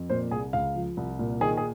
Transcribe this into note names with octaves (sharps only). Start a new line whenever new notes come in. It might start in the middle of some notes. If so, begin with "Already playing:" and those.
Already playing: F2
A#2 C5
C2 G#4
C#2 F5
F3
C2
A#2
D#3 G#4
G#4